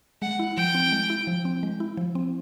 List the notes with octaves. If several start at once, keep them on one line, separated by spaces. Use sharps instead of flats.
G#3 F#5
E4
F3 G5
C4
G#3
E4
F3
C4
G#3
E4
F3
C4